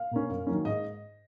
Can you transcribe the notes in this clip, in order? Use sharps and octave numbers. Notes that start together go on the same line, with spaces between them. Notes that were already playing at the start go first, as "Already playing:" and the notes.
Already playing: F5
B2 A#3 C#4
F#2
D#3 F#3 A#3 C#4
G#2 D#5